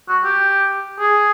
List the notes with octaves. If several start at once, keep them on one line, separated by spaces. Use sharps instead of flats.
F#4
G4
G#4